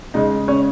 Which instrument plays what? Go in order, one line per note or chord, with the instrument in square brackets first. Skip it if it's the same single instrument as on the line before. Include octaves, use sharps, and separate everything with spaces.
[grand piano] C#3 G#3 D#4
C#4